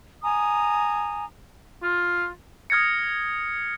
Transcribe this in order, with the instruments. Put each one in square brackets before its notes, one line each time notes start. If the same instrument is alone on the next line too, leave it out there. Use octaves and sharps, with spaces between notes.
[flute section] G#5 A#5 D#6
[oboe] F4
[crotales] D#6 F6 G#6 A#6 C#7